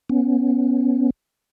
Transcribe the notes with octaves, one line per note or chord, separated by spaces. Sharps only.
B3 C#4